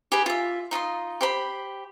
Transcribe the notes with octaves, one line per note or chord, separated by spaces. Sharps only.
G4 G#4 B4 D#5
F4 E5
D#4 F4 D#5 C6
G4 C5 B5